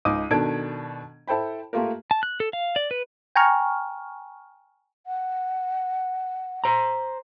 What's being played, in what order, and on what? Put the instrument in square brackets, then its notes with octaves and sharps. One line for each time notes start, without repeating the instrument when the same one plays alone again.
[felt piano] C#2 D#4 D6 D#6 D#7
B2 D#3 D4 A4 G#6 D7
E4 A4 C5 G5 B5
A3 A#3 F4 G4 A#4
[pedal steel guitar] A5
F#6
A4
F5
D5
B4
[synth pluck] G5 G#5 A#5 C#6 F6
[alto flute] F#5
[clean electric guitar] C5 A#5